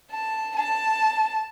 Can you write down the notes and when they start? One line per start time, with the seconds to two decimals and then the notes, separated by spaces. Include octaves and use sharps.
0.11 A5
0.56 A5